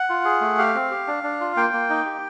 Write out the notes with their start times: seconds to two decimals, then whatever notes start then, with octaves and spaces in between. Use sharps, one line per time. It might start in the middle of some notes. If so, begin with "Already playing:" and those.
Already playing: F#5
0.09 F4
0.25 G#4
0.41 A3
0.58 G4 F5
0.75 C4
0.91 G4
1.08 D4
1.24 D4
1.41 F4
1.56 A#3 G5
1.73 A#3
1.90 D#4
2.06 G4